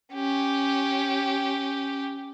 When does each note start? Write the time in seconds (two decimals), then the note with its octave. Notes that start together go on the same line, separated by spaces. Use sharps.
0.14 C#4 G4